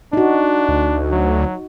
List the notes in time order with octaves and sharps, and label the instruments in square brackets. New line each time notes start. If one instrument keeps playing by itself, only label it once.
[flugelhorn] D4 [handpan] D#4 F#4
[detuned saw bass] D2
[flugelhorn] F#3